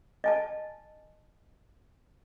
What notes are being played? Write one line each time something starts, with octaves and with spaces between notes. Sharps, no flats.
D#5 G#5 A5